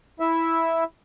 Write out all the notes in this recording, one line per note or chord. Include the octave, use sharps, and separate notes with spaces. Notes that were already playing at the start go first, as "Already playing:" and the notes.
E4 E5